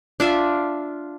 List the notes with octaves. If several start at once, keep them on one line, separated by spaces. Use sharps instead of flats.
D4 F4 E5